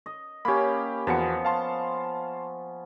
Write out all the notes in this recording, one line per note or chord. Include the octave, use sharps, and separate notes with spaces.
D#5
A#3 C#4 G4 B5
E2 F3 B3 F#4 C#7
F5 A5 C6